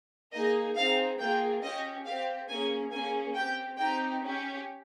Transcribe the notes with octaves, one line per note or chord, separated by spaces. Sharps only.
A#3 D#4 G#4 D#5
C4 D#4 G#4 F5
A#3 F4 G#4 G5
C#4 G4 D#5
C4 G4 F5
A#3 C#4 G#4 G#5
A#3 C#4 G#4 G#5
C4 G4 G5
C4 D#4 G4 G5
C#4 G4